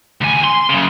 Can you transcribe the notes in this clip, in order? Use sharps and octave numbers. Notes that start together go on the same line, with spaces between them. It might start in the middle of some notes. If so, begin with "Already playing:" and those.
D2 G#5
C6
F#2 C#3